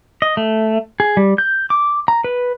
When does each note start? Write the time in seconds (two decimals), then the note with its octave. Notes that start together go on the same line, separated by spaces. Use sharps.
0.22 D#5
0.37 A3
1.00 G#4
1.17 G3
1.38 G6
1.70 D6
2.08 A#5
2.24 B4